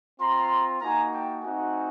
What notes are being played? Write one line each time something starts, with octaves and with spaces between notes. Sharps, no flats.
C4 F4 A#5 C6
A#3 D#4 F#4 G#5 A#5
G5 A5
A3 C4 D#4 F#4 F#5 G#5